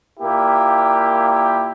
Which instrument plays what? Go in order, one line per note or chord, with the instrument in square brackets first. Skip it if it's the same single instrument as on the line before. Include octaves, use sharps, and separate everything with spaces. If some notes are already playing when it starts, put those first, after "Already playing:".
[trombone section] A#2 A#3 E4 G4